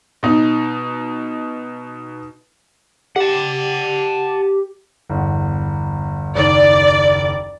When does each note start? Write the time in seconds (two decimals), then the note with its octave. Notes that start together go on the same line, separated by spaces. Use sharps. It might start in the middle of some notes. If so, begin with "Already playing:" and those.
0.23 B2 D#4
3.16 G4 F#5 A5
5.09 G1 E2
6.35 F#1 D#2 D5